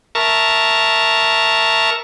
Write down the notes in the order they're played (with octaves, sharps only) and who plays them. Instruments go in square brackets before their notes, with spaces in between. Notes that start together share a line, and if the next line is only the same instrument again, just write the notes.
[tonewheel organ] A#4 E5 A5 A#5 C#6